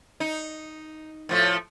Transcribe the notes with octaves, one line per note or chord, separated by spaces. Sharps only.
D#4
A2 F3 A3